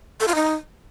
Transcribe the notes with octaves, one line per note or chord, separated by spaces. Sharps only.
A4
F4
D#4